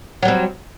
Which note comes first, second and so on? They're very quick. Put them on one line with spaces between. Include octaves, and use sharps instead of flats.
F#3 G3 C4